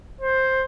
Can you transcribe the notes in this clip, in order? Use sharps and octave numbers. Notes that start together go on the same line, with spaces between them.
C5